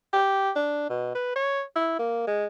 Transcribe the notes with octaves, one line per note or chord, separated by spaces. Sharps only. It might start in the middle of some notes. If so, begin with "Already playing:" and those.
G4
D4
B2
B4
C#5
E4
A#3
G#3